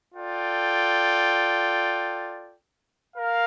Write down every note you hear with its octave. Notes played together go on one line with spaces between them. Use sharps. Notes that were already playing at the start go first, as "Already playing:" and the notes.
F4 A4 D5 G5
A#4 F5